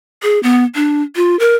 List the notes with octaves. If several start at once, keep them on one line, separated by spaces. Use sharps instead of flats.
G#4
B3
D4
F4
A#4